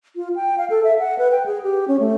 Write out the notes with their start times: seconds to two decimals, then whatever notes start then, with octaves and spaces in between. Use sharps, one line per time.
0.16 F4
0.36 G5
0.58 F5
0.70 A4
0.84 E5
0.99 F#5
1.18 B4
1.32 G5
1.46 G#4
1.63 G4
1.88 C#4
2.00 A3